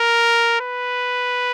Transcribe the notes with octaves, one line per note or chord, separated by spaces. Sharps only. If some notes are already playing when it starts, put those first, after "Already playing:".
Already playing: A#4
B4